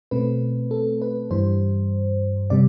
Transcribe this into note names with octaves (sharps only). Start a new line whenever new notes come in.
B2 A3 C4 B4
A4
B4
G2 E3 G3 C5
C3 G3 D5